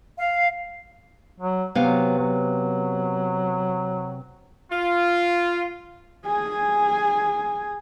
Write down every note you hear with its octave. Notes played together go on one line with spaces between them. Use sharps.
F5
F#3
C3 F#3 B3 F5
F#3
F4
G#4 G#5